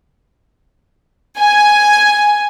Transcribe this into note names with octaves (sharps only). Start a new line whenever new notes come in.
G#5